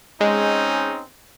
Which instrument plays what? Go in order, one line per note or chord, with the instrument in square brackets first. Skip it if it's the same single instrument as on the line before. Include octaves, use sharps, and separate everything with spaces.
[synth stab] G#3 [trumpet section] C4 C#4 D#4